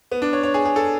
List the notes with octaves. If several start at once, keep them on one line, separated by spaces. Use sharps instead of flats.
B3
D4
C#5
C#5
G#4
G#4
A4